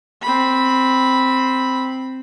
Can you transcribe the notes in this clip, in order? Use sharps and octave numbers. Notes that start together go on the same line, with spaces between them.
C4 B5